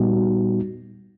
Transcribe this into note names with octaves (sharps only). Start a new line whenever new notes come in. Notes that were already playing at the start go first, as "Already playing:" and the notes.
Already playing: A#2 G3 B3 D#4 F#4